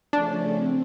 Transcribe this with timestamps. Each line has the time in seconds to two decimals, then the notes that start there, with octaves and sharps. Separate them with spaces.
0.13 C#3 F3 A3 C#4 D4
0.54 C4